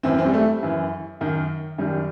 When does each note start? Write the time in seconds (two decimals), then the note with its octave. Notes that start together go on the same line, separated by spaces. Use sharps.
0.03 F#2 E3 C4
0.18 C4
0.26 G3
0.34 A3
0.63 F#2 E3
1.21 F#2 D#3
1.78 F#2 D#3 G3